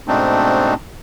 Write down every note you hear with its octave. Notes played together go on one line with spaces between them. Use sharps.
G#2 B2 A3 C4 D4 D#4